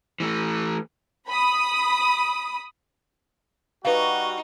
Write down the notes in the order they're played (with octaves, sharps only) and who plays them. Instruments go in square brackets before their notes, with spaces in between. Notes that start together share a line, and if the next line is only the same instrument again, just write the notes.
[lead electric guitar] E3 A3
[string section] B5 D#6
[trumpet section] G3 F#4 [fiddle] D#4 [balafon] B4 F5